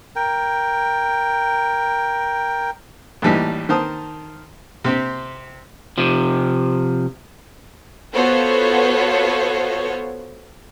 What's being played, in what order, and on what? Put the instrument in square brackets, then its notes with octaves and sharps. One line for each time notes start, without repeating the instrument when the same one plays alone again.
[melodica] A#4 G5
[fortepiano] A#1 A2 E3 G3 D#4
D#3 A#4 C5 A5 D#6
C3 C4 G4
[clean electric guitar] C3 F3
[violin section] B3 F4 F#4 A4 C5 C#5